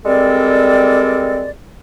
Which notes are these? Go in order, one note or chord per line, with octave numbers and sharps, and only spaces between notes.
G3 G#3 C4 A4 A#4 D5